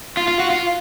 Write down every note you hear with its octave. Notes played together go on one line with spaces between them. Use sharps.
F4
F4
F#4
F4